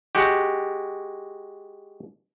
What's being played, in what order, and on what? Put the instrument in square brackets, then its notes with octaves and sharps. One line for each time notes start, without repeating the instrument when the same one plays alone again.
[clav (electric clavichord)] G#3 F#4 G4